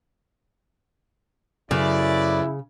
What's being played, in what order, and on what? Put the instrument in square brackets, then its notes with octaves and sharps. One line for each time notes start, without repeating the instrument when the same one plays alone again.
[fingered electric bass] F#2 [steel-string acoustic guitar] C#3 [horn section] A3 B4 D5 [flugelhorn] E4